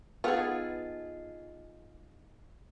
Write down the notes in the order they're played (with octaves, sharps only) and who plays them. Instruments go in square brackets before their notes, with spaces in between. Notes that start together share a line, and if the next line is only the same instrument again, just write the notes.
[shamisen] B3 [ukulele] D#4 A4 F#5 [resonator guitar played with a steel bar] F4 G#4